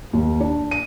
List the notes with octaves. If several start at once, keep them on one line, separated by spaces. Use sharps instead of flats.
D#2
D4
D#7